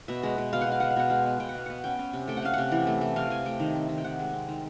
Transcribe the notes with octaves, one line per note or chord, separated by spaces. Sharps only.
B2 E5
G#3
B2
B2 F5
F#5
B2
F5
G#3 F#5
F5
B2 F#5
G#3 F5
B3
B2 G5
F#5
B3 F5
B3 F#5
C#4 G5
C#4
C3
A3 G5
F#5
C#4 F5
C3 F#5
E3
A3
A3
C3 F5
C3 G#5
A3 G5
D#3
C4
D#3
G5
D#3 F#5
G#3
C4
D#3